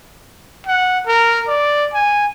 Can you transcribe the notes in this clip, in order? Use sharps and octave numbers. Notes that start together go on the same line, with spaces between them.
F#5
A#4
D5
G#5